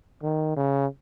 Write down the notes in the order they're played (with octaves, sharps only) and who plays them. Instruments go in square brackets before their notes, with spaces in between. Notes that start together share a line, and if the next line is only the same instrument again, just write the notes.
[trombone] D#3
C#3